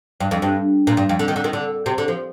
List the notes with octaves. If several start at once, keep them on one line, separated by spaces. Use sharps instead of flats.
G2
F2
G2
A#2
G2
F2
D3
D#3
D3
D#3
D3
C3
D3
F3